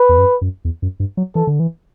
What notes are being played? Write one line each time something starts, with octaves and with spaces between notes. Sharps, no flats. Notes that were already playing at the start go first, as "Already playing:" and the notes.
Already playing: B4
E2
F#2
F#2
E2
F#2
G2
F#3
E3 A4
D3
E3